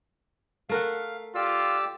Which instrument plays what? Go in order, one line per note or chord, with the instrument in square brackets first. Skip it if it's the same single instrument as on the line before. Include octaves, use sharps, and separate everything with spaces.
[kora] A3 A#4 F#5 [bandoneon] F5
[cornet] F4 [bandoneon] G4 D5 E6